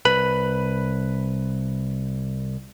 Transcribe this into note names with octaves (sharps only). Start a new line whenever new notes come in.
C2 B4 B5